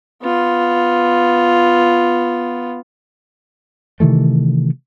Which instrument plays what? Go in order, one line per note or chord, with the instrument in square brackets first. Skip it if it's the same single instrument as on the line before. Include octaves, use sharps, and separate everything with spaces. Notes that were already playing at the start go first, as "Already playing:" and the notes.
[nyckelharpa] B3 F4
[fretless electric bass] C3 D#3 E3 A3